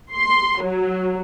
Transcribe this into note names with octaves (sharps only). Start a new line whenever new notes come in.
C6
F#3